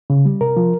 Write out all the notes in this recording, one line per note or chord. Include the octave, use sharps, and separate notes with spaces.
C#3
G3
C3 A#4
F3